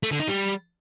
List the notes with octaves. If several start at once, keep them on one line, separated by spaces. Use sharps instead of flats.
A3
D3
D#4
G3